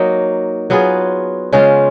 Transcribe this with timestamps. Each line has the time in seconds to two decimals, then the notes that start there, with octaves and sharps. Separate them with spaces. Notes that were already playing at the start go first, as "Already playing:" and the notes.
Already playing: F#3 A#3 D#4
0.70 F#3 B3 F4 G#4
1.52 C#3 G#3 C#4 F4